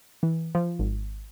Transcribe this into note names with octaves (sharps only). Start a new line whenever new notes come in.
E3
F3
G#1